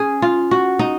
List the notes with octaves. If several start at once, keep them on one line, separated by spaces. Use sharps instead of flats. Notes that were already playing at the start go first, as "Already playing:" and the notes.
Already playing: C#4 G#4
F4
F#4
D#4